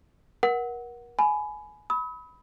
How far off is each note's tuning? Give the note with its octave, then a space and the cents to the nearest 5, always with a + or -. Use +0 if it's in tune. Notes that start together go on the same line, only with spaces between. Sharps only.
A#4 +35 F#5 +0
G#5 +20 B5 +10
B5 +0 D#6 +45